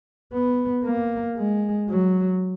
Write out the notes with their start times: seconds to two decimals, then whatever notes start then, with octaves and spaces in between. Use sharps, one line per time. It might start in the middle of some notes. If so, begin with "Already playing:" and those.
0.33 B3
0.85 A#3
1.37 G#3
1.89 F#3